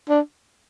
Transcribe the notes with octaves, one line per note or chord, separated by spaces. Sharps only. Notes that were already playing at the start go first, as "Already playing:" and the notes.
D4